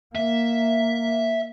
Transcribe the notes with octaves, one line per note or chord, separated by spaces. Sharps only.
A#3 E5